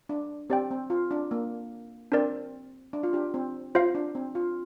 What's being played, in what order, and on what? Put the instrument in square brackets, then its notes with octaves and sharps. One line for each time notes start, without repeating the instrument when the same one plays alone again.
[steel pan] D4
[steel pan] C4 [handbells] G4 D5 G5
[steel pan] C4
F4
D4
A#3
[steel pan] C4 [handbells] D4 A#4 D5
[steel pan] D4
F4
D4 G4
C4
[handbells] F4 C5 F5
[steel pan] D4
C4
F4